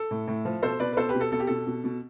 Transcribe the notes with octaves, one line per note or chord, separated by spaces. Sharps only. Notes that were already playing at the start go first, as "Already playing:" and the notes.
Already playing: A4
A2
A2
F3
B2 A4 C5
B2 B4 D5
B4
B2 A4 C5
G4 B4
B2
A4
B2 A4
G4
B2 A4
B2
B2